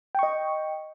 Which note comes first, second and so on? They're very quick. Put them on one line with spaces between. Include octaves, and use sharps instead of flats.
G5 C#6 D#5